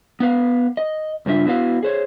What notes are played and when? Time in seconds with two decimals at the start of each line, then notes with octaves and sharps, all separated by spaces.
0.20 B3 B4 F5
0.77 D#5
1.26 G2 C#3 G3 D4 F4 E5
1.46 B3 E4 F#4 B4 E5 F5
1.83 G#4 C5 C#5